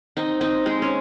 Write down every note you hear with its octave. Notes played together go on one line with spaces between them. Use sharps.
C4 D#4
C4 D#4
G#3 C4
C#4